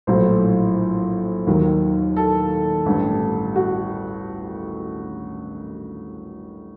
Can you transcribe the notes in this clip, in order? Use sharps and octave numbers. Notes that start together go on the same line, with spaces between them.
A#1 A2 F#3 C5
D#2 D#3 F#3
A4
A1 G2 D3
F#4